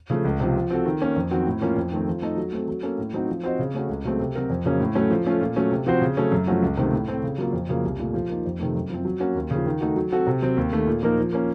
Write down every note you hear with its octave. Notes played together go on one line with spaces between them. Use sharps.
C#3 F3 A3
C#2
C3 F3
F3
C4 F#4 A4
D#3
A#3 C#4
F2
D#3 F#3 C4 F#4
A2
F3 A#3 C#4 F4
F2
D#3 A3 C4
F3
A3 D#4 A4 D#5
F#3
A3 C4
F#3
A#3 C#4 A4
A2
F#3 C4 D#4 F#4
F3
C4 F#4 C5 D#5
C#3
A3 C#4 F#4
C#2
C#3 F#3 A3 C4
C3
F#3 C4 F#4 A#4
F2
C#3 F#3 A#3 C#4
A2
F#3 A3 C#4
F3
A3 C#4 F4
A#2
F#3 A3 C#4
C3
F3 C4 F#4 C5
C#3
F#3 A3 C#4 A4
F#2
F3 A3 C#4 F#4
C#2
C3 D#3 A3 C4
A2
A3 C4
C#3
F#3 A#3 F4
F2
C#3 F#3 A#3 F4
C2
A#2 A3
F3
A#3 D#4
F2
C3 D#3 A3
F#2
F3 C4
F#3
A#3 C#4 F#4
D#2
C#3 F3
D#3
A3 D#4 F#4
F#3
C4 F#4 A4
C3
F#3 C4
D#2
D#3 A3
A#2
F3 A#3 D#4 A#4
F3
A#3 C#4